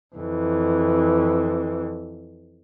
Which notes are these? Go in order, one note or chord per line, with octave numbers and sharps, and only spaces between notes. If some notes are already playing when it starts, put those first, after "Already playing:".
F2 E3